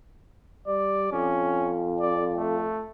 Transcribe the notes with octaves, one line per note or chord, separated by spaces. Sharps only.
G3 D5
F2 C#4
D5
A3